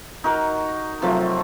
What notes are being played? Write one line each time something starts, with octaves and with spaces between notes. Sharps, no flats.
D#4 F#4 A#4
C3 F3 F#3 A3